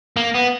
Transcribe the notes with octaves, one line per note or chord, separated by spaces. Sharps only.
A#3
B3